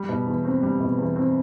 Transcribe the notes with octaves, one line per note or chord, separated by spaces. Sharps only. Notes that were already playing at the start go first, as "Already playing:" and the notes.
Already playing: G3
B2
E2
C4
G3
B2
E2
C4